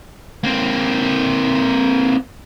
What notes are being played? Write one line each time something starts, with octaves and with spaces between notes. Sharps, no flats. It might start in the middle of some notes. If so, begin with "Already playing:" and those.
A#3 C4